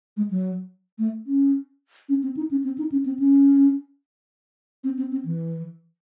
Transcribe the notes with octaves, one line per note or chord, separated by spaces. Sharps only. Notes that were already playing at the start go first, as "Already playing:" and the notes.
G#3
F#3
A3
C#4
C#4
C4
D#4
C#4
C4
D#4
C#4
C4
C#4
C4
C4
C4
E3